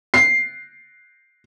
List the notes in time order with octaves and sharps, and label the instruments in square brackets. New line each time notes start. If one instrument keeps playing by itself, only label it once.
[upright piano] C7